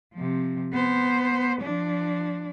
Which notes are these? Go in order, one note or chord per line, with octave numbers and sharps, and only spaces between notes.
C3 F3
B3 C5
F3 D4